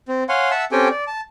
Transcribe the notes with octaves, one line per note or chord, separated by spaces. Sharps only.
C4
C#5 F5 F#5 G#5 C6
E5 F#5 A5 E6
C4 C#4 G4 A4 G5 G#5
D5
A5